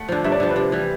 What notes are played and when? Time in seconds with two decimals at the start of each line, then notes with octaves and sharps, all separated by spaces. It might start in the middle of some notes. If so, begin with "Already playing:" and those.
Already playing: A3 F#5
0.09 D3 F3
0.24 G2 E5
0.32 D5
0.40 D3 F3
0.49 B4
0.56 C3
0.72 E3 G3